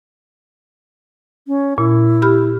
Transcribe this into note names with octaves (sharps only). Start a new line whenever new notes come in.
C#4
A#2 E4
G4 B5 F6